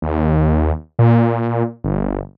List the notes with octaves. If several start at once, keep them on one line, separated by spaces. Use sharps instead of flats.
D#2
A#2
G1